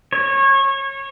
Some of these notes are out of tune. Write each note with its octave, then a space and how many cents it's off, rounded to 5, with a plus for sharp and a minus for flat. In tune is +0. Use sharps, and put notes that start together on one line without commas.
C#5 -25